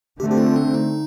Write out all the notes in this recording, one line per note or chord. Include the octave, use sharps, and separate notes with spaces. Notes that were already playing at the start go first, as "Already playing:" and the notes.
D3 A3 C4 G4
G4
F4
D4
D#4